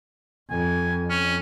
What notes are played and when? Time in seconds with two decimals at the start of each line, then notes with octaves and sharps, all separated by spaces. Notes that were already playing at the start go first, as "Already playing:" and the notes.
0.50 F2 G#5
1.09 C#4